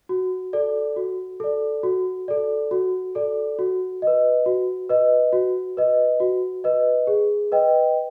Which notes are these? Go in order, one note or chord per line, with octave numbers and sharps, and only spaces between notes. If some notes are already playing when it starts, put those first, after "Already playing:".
F#4
A4 D5
F#4
A4 D5
F#4
A4 D5
F#4
A4 D5
F#4
B4 D#5
F#4
B4 D#5
F#4
B4 D#5
F#4
B4 D#5
G#4
B4 D#5 G5